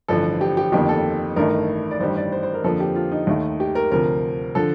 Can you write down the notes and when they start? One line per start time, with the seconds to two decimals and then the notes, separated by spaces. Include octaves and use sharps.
0.08 A1 G2 D3 F3 A4
0.41 G4
0.57 G4
0.72 G1 F2 D#3 A#3 G4
0.89 A4
1.36 A1 G2 D#3 A3 A#4
1.91 D5
2.00 A1 G2 D#3 G3 C5
2.17 D5
2.32 C5
2.43 C5
2.54 A#4
2.64 F2 D3 F3 A#3 A4
2.80 G4
2.95 F4
3.12 D#4
3.27 D#2 D#3 A3
3.60 G4
3.75 A#4
3.91 D2 C3 F3 A#4
4.55 D3 F3 A4